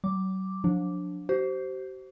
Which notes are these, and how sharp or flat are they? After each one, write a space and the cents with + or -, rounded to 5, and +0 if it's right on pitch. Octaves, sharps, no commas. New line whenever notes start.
F#3 +40 D6 +0
F3 +45 D4 -5
G4 -45 C5 +0